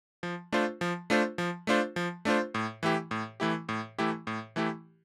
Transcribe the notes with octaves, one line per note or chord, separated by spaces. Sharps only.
F3
A3 D4 F4 C5
F3
A3 D4 F4 C5
F3
A3 D4 F4 C5
F3
A3 D4 F4 C5
A2
E3 A3 E4 G4
A2
E3 A3 E4 G4
A2
E3 A3 E4 G4
A2
E3 A3 E4 G4